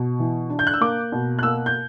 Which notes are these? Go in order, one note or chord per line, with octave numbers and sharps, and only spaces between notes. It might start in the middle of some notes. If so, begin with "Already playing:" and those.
Already playing: B2
E3
D4
G6
F#6
E6
A#3 D6
B2
F#6
A#3 E6
G6